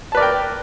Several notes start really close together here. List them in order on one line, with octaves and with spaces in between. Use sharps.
A5 B4 D5 A#4 G5